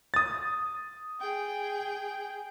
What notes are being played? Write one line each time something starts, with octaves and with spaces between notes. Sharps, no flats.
D#6 A6
G#4 G5